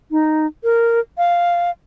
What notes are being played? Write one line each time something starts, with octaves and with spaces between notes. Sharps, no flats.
D#4
A#4
F5